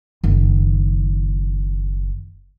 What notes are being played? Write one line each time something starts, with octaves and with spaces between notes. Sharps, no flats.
F#1 D#3